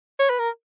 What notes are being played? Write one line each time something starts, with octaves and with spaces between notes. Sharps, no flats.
C#5
B4
A#4